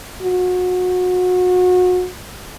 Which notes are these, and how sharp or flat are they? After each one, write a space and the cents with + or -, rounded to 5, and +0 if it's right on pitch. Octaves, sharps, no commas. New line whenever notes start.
F#4 -30